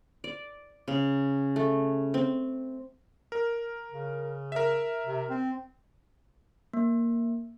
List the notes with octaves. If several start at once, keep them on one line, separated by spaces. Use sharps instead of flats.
D5
C#3
A3
C4
A#4
C#3
A#4 E5
C3
C4
A#3